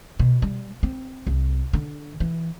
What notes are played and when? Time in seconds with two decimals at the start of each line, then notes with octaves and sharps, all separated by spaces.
0.19 B2
0.42 G3
0.83 C4
1.27 C2
1.73 D3
2.20 E3